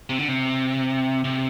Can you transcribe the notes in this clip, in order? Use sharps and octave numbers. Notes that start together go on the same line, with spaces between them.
C3
D3
C3
C3